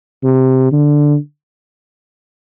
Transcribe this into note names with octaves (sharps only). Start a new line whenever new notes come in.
C3
D3